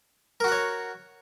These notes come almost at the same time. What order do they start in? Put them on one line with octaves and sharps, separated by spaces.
A#4 F#4 F#5 C#5